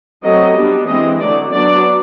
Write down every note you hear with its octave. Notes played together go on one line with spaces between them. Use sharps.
F#3 A3 C4 D#5
G3 B3 D4
E3 G#3 C4 D#5
D3 F#3 A3 D5
F#3 B3 D4 D5